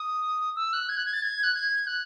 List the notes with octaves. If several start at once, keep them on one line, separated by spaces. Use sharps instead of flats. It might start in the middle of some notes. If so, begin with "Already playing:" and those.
Already playing: D#6
E6
F#6
G#6
F#6
G#6
A6
G#6
F#6
G#6
F#6